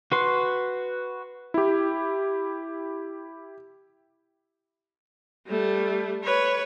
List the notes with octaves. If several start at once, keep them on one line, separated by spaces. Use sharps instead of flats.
F#4 B4 C6
E4 G4
G3 A3
B4 C#5